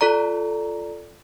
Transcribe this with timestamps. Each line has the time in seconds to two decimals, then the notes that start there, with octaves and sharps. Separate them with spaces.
0.01 F4 A4 D5 A#5